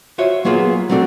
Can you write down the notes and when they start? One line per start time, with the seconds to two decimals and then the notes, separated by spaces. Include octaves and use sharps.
0.18 F4 F#4 C5 C#5 E5
0.45 F#3 A#3 B3 F4 G#4
0.89 F#3 A3 C4 D4 A4